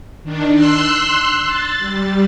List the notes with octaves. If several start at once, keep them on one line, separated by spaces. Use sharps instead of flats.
D#3 D4
C6 E6 F#6
A6
G3